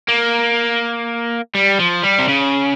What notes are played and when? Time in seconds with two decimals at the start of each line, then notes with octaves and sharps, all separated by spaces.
0.09 A#3
1.55 G3
1.79 F3
2.03 G3
2.19 C3
2.28 C#3